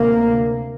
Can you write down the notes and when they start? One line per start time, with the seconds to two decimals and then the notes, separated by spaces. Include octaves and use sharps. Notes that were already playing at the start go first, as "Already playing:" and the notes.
Already playing: D2 C3 A#3